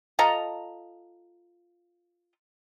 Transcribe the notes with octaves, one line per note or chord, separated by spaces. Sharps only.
F4 A4 D#5 A#5